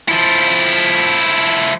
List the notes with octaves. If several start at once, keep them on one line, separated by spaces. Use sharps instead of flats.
F3 E4